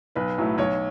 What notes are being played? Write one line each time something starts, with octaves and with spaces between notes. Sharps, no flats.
B1 B4
A2 F#3 A3
B1 C#5